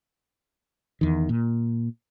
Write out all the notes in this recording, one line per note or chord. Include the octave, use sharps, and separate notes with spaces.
E2 D#3
A#2